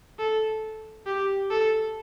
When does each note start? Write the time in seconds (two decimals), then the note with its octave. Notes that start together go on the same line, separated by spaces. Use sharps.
0.19 A4
1.07 G4
1.51 A4